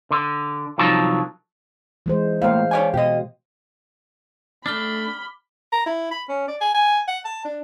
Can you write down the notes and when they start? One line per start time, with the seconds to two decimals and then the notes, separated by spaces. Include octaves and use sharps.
0.11 D3
0.78 C2 D3 F3 F#3 D#4 A5
2.06 E3 G#3 C5
2.42 A2 A#3 C5 F5
2.71 C#5 D5 G#5
2.94 B2 G4 D#5
4.66 A3 D4 B5 D6 F6 G7
5.72 A#5
5.86 E4
6.11 B5
6.29 C#4
6.48 D5
6.61 G#5
6.75 G#5
7.08 F#5
7.25 A5
7.44 D4